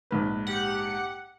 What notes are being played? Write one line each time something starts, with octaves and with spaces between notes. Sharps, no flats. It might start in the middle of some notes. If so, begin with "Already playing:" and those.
A#1 G#2 B4
G4 F#5